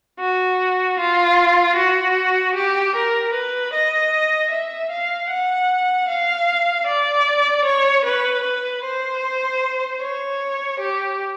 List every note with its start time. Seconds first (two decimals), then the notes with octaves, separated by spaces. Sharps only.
0.19 F#4
0.99 F4
1.76 F#4
2.55 G4
2.95 A#4
3.33 B4
3.73 D#5
4.51 E5
4.90 F5
5.29 F#5
6.08 F5
6.87 D5
7.65 C#5
8.04 B4
8.44 B4
8.83 C5
10.01 C#5
10.79 G4